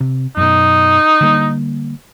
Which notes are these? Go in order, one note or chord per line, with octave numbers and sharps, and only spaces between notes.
C3
F#2 B2 D#4
D3 G3 A#3